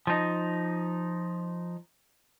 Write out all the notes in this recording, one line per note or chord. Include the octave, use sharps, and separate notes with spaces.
F3 D#4